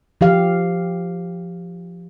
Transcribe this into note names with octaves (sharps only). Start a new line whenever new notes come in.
F3 G4 F5